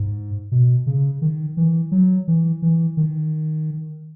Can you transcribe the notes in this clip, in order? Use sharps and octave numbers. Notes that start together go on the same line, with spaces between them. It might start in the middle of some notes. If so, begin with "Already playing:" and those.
Already playing: G#2
B2
C#3
D#3
E3
F#3
E3
E3
D#3